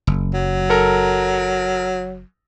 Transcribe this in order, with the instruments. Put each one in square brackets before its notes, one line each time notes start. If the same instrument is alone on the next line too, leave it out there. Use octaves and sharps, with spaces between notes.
[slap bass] F#1
[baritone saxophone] F#3
[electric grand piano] A4 A#4 A#5